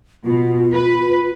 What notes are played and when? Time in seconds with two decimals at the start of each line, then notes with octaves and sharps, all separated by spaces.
0.25 B2 F4
0.73 B4